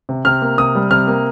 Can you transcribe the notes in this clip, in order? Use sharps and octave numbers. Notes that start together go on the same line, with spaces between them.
C3
C3 F6
A#3
C3 D#6
G3
C3 F6
A#3